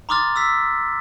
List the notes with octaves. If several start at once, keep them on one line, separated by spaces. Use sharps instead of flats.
A#5 C6 D6 D#6 F6 A6
D#6 E6 B6